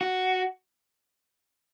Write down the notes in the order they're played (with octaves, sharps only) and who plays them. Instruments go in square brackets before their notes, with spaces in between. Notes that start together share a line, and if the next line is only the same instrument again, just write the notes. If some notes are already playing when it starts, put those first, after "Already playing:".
[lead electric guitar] F#4